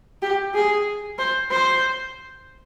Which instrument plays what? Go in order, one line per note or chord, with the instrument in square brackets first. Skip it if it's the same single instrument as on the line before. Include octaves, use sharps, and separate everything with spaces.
[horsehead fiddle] G4
G#4
C5
C5